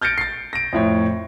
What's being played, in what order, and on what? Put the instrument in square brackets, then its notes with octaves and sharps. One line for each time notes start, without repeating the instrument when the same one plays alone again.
[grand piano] F6 G6 A6 A#6 C#7 D7
A6 C7
A#6 D7
F2 A2 C#5